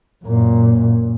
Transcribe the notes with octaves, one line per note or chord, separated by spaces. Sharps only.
F#2 A#2